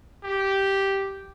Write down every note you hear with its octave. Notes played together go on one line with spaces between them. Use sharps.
G4